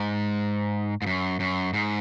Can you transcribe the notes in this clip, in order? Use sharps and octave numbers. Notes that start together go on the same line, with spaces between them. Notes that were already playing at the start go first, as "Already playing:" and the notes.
Already playing: G#2
G#2
F#2
F#2
G#2